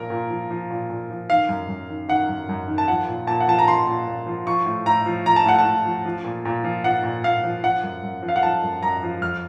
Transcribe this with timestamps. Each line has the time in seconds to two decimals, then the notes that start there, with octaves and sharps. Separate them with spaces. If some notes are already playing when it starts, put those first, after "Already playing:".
Already playing: A#2 F3 A#4
0.10 A#2
0.30 F3
0.50 F3
0.70 A#2
0.90 A#2
1.10 F3
1.30 D#3 F5
1.49 F#2
1.69 F#2
1.89 D#3
2.08 D#3 F#5
2.29 F#2
2.49 F#2
2.68 D#3
2.78 A5
2.88 F3 F#5
3.07 A#2
3.27 A#2 A5
3.40 F#5
3.48 F3 A5
3.59 A#5
3.67 F3 C6
3.87 A#2
4.08 A#2
4.26 F3
4.46 F3 C#6
4.66 A2
4.86 A2 A#5
5.06 F3
5.26 F3 A#5
5.36 A5
5.46 A2 F#5
5.58 A5
5.65 A2
5.85 F3
6.05 F3
6.24 A#2
6.45 A#2
6.64 F3
6.84 F3 F#5
7.04 A#2
7.24 A#2 F5
7.44 F3
7.63 F3 F#5
7.83 F#2
8.03 F#2
8.22 F3
8.29 F5
8.36 F#5
8.43 F3 A5
8.63 F#2
8.83 F#2 A#5
9.03 F3
9.21 F2 F6